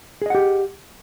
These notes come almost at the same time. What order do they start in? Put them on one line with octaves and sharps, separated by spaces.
G#4 D#5 F#5 G4